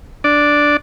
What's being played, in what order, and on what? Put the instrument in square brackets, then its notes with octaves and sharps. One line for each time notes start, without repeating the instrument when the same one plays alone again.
[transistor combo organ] D4 D5